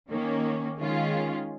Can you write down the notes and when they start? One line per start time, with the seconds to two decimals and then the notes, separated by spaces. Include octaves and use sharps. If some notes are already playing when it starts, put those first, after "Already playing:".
0.11 D#3 A#3 C#4
0.79 D#3 G#3 C#4 F4